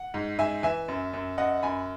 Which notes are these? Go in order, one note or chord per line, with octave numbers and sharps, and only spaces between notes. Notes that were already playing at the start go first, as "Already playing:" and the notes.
Already playing: F#5
G#2
G#2 E5 G#5
E3 E5 G#5
F#2
F#2
F#2 D#5 F#5
F#2 G#5 B5